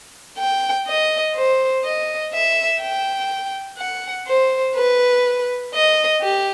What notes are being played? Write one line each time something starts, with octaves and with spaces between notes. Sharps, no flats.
G5
D#5
C5
D#5
E5
G5
F#5
C5
B4
D#5
G4